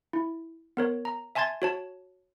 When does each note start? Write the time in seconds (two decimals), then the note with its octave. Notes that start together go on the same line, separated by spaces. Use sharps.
0.13 E4
0.77 B3 A#4 C#5
1.05 A#5
1.35 E5 G#5 A5 C6 G#6 A6
1.62 F#4 C#5 A5